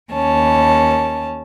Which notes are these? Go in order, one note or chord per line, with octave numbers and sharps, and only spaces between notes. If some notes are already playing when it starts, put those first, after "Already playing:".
D#2 C#4 A5